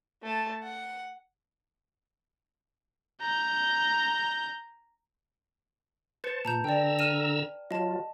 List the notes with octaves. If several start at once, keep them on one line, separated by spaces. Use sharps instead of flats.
A3 A5
F#5
A#5 G6
B4 C5 A5 C#7
A#2 A5 A#5 G6
D3 D5 G5 A#5 E6
F6 D#7 E7
F#3 F4 D#5 A5